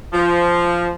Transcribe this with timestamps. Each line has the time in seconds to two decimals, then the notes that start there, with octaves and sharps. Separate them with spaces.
0.13 F3